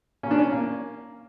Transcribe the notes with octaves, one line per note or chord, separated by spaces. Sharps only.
A#3 C#4
D4
C#4
A#3